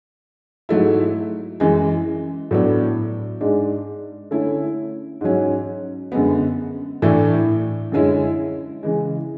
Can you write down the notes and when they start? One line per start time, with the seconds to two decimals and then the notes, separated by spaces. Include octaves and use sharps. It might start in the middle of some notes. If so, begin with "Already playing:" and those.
0.69 G#2 F#3 A3 E4
1.60 F#2 E3 G#3
2.51 A2 F#3 B3 D4
3.41 G#2 G#3 D4
4.31 D3 A3 C#4 E4
5.21 G#2 F#3 C#4
6.12 F#2 D3 G#3 B3
7.02 A2 E3 A3 D4
7.92 F#2 D3 G#3 C#4 E4
8.83 C#3 E3 G#3